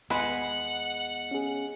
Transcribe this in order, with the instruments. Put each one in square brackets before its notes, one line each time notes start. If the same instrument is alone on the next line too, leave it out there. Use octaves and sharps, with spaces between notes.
[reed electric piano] D#2 [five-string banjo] G#3 B4 [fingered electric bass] B3 [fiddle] F#5
[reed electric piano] C#4 G#4